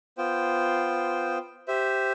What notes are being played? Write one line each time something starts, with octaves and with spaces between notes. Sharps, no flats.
B3 F4 C5 G5
G4 C5 E5